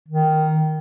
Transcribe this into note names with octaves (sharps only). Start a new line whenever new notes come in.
D#3